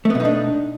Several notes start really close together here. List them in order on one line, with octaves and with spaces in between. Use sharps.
A3 B3 B2 D#4 D4